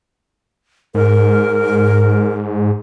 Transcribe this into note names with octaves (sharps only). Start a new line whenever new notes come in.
G#2 A#4